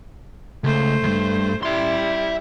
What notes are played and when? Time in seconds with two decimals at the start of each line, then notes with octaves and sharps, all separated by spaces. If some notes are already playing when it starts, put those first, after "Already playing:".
0.64 C#2 A3 C5
1.03 E2 G2
1.63 G3 E4 E5 C6